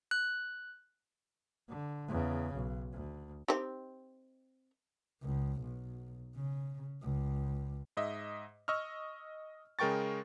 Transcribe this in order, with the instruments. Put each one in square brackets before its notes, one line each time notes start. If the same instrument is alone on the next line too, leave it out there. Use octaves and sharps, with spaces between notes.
[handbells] F#6
[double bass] D3
E2 C#3
B1
D2
[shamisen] C4 D#4 G4
[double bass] C#2
B1
C#3
C#2
[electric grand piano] G#2 D#5 E5
D#5 C#6 E6 F6
C#3 G#3 A#4 G5 C#6 A6